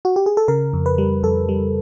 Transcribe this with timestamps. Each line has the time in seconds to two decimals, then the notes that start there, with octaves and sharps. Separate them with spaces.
0.05 F#4
0.16 G4
0.26 G#4
0.37 A4
0.48 C#3 A#4
0.73 F2
0.86 B4
0.98 G3
1.23 F2 A4
1.49 G3